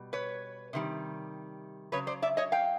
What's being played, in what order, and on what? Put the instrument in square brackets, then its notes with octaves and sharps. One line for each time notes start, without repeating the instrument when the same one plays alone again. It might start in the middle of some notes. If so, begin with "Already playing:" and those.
Already playing: [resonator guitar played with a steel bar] B2 G3
B4 C#5
C3 D#3 G3
C#3 F#3 B4 C#5
C5 D5
D5 E5
C#5 D#5
F5 G5